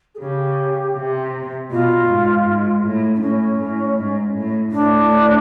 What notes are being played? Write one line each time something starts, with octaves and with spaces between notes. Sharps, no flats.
G#4
C#3 G4
C3
B2 F4
G#2
G#2
A2
D4
A2 C#4
A2
G#2
A2
A2 D4